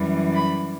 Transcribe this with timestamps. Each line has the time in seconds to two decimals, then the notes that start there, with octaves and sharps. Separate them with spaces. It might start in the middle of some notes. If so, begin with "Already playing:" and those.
Already playing: F#2 E3 G3
0.34 B5